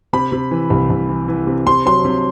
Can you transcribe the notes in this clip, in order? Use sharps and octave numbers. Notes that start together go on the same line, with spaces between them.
C3 B5
C3
E3
C2
C2
E3
E3
C3
C3 C6
F#3 C6
C3